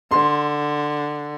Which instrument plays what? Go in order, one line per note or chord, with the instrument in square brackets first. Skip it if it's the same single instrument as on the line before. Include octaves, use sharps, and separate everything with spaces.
[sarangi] D3 [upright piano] C6